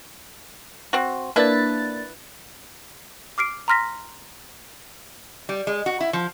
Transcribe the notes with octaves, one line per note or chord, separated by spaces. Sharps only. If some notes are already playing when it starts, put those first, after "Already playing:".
C4 F#4
A#3 D4 E4 B4 A6
D6 F6 C7 D7
A#5 C6 F6 A#6 B6
G3
G#3
F#4
E4
F3